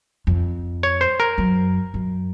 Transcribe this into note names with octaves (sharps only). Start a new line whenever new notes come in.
F2
C#5
C5
A#4
F#2
F#2